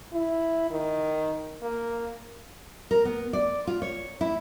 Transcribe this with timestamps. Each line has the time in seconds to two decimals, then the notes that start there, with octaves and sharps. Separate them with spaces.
0.13 E4
0.71 D#3
1.62 A#3
2.91 A#4
3.05 B3
3.33 D5
3.67 F4
3.82 C#5
4.21 E4